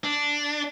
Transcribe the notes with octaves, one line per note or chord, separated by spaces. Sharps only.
D4